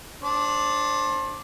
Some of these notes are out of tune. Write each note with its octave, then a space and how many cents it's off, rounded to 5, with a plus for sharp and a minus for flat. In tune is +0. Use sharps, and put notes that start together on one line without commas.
D4 +0 C5 +30